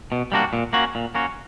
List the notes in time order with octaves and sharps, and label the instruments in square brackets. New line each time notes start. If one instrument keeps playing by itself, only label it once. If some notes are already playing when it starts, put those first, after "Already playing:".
[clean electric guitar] B2
G3 A#3 D4 F#4
A#2
A#3 C#4 F#4
A#2
A#3 C#4 F#4